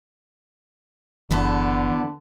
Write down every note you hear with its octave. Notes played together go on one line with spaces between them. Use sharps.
F#1 E2 D3 E3 B3 A4